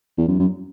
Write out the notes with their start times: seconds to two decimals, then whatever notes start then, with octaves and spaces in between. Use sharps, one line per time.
0.18 E2
0.28 F#2
0.39 F#2